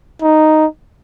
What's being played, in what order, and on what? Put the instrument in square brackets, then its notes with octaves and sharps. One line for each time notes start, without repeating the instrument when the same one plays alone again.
[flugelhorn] D#4